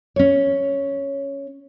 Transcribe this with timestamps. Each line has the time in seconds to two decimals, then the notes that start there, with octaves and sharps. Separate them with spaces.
0.16 C#4 C#5